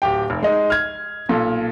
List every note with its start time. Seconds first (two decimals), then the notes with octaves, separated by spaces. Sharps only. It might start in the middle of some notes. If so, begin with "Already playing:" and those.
0.02 D1 G4 G5
0.30 F1
0.42 G#3 D#4
0.70 F6 G#6
1.29 B1 A#2 A4